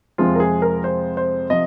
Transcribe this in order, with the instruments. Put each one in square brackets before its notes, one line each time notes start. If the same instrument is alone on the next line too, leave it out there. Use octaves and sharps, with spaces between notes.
[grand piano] F2 C3 F3 G#3 C4 F4
A#4
G#4
A#4
C5
C5
C3 F3 D#5